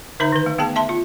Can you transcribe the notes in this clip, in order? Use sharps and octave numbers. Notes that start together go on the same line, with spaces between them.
D3 D#4 C5 E5 A#5
D#3 B4
A3
A3 B3 G#4 A5
E5 A5 C6
F4